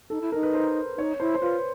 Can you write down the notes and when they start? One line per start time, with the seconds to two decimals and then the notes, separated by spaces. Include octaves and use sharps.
0.10 D#4 A4
0.21 E4
0.32 D#4 A#4
0.43 B4
0.54 C5
0.97 D#4 C#5
1.20 E4 C5
1.34 C5
1.41 F4 B4